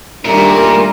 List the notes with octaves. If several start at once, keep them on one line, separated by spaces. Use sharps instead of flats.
A#2 D#3 F#3 G3 A3 D4 A#4 A#5